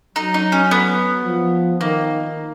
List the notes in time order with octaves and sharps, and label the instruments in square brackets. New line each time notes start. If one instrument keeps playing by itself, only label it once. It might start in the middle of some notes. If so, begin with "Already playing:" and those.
[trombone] F#3 [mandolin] D#4
[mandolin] D#4
C#4
B3
[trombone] F3
[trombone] D#3 [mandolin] A#3